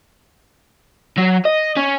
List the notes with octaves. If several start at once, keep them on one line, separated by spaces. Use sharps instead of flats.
F#3
D#5
C#4